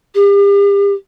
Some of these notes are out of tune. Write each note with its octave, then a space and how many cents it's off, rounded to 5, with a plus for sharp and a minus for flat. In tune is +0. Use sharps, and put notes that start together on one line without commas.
G4 +40